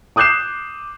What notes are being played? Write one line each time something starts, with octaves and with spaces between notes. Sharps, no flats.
D6 D#6 F#6 G6 C7 E7